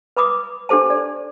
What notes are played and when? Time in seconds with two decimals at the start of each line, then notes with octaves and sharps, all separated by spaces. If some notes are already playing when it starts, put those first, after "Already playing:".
0.17 B4 B5 D6 D#6
0.69 D4 G4 A4 C5 A5
0.90 D5